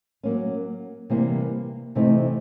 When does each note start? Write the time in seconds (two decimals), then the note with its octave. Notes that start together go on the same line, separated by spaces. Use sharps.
0.23 F#3 A#3 C#4
1.10 C3 E3 G3 A#3
1.95 C3 E3 A3 C4 D#4